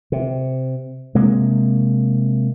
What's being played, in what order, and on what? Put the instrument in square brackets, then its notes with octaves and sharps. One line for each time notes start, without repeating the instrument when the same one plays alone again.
[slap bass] C3
C3 G#3 A#3